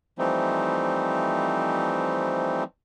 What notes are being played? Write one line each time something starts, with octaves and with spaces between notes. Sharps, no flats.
E3 F3 G3 A3 C4 D#4